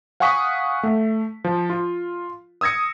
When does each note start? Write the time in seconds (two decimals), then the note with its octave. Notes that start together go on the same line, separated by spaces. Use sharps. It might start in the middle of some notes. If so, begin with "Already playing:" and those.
0.20 F5 F#5 G#5 C#6 D#6 B6
0.83 A3
1.44 F3
1.70 F4
2.61 D#6 E6 G#6 A#6 C#7